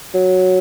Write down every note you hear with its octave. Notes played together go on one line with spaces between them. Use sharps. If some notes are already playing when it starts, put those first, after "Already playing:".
F#3